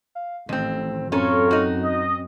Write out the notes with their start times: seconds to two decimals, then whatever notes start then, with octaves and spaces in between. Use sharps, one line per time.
0.15 F5
0.49 A1 F2 A2 D#3 C4
1.12 F#2 C4 C#4 F4 A4 A#4 C#5
1.51 D#4 F#4
1.83 D#5